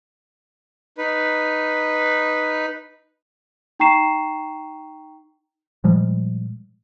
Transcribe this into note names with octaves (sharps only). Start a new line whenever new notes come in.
D#4 B4
D#4 G5 A#5 C#6 C7 E7
A#2 F3 G3 G#3